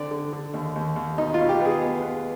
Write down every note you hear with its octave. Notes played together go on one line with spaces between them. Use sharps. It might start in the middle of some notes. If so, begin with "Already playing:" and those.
Already playing: D3 C4 D5
D3
D3
D#2
D#2
D#2
B2 D#4
B2 F4
G4
B3 G#4
B3
B3